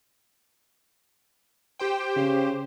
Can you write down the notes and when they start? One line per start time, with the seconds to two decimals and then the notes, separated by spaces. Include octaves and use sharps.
1.79 G4 C5 G5
2.16 C#3 G4 C5